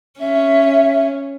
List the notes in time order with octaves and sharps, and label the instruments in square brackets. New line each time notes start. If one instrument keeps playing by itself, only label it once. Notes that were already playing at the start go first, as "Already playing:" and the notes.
[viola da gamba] C#4 [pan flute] E5